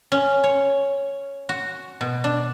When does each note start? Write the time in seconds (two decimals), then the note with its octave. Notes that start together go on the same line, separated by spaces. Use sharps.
0.12 C#4
0.44 C#5
1.49 F#4
2.01 B2
2.24 D4